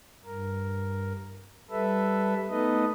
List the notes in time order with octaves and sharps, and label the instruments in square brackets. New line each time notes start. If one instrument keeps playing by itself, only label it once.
[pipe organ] G2 A#4
G3 A4 B4 E5
A3 B3 D#4 A4 B4 D#5